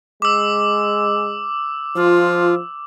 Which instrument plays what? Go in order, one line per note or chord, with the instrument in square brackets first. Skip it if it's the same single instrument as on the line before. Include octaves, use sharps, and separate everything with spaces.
[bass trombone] G#3 [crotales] D6 E6
[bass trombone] F3 [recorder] F4